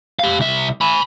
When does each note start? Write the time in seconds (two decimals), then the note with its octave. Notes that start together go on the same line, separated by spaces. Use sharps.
0.19 G4 F5
0.40 C2 E5
0.81 G#5 B5